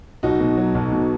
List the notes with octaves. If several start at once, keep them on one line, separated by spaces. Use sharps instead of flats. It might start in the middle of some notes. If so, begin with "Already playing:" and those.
B1 D#4 F#4
B2
F#3
B1
B2